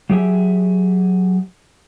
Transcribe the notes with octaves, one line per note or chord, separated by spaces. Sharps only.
F#3 G4 G#4 E5